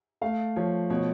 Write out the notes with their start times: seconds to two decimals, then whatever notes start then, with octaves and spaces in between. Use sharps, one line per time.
0.21 A3 F5
0.56 F3 C#5
0.90 B2 C#5